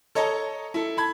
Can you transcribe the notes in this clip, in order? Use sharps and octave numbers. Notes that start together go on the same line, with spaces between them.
A4 C#5 D#5 A5 A#5
E4 A4
A5 B5 G#6